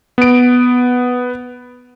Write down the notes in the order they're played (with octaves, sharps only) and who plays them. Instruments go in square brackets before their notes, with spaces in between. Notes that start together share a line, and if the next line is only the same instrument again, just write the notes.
[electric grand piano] B3 D7